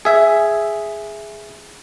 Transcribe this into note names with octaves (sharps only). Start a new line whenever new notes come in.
G#4 E5